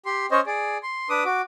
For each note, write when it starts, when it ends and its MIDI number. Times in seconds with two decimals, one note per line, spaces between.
0.06 0.26 67
0.06 0.26 84
0.31 0.40 61
0.31 0.40 72
0.31 0.40 73
0.31 0.40 75
0.46 0.78 68
0.46 0.78 74
0.83 1.09 84
1.10 1.24 62
1.10 1.24 71
1.10 1.24 86
1.10 1.24 87
1.25 1.42 66
1.25 1.42 86